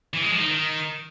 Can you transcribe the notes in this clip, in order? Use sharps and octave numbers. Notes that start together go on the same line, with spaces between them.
E3
G#3
F3
D#4
D#3